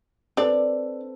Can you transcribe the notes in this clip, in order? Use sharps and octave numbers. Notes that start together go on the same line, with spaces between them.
C4 D4 A4 B4 D5